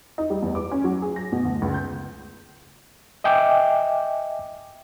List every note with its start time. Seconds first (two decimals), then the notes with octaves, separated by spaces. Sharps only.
0.18 D#4
0.30 G3
0.42 E2
0.55 D6
0.71 C#4
0.84 F#3
1.02 G#4
1.16 A#6
1.32 B2
1.45 D2
1.62 C#2
1.74 G6
3.24 D#5 E5 G5 G#5 D6